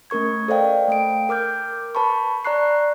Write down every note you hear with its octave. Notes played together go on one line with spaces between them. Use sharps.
A3 C#4 A#4 C#6 G#6
A4 C5 D5 D#5 F5 G5
A3 G5 D7
A#4 D6 F6 G6
B4 A5 B5 C#6
D5 A#5 C#6 F#6 C7